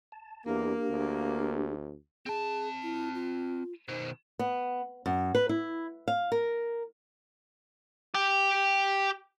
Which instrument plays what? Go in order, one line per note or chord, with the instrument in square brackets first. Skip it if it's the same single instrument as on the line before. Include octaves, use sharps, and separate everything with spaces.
[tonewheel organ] A5
[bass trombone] E2 [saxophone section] A#3 [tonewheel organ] D4 G4
[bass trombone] D2
[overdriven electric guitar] C4 A5 [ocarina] G#4
[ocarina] E4
F4
[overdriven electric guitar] B2 D#3 [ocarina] C5
[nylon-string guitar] B3
F#2
B4
E4
F5
A#4
[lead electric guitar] G4 G5